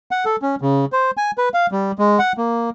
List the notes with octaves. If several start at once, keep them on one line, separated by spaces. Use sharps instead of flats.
F#5
A4
C#4
C#3
C5
G#5
B4
F5
G3
G#3
F#5
A#3